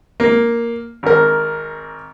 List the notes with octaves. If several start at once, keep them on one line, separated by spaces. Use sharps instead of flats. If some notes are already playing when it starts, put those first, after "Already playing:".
A#3
G#1 A#4